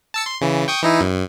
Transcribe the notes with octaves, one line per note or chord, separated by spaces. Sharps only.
A5 E6 C#7
C6
C#3 E3
G5 C#6 D#6
E3 D#4 E4
F#2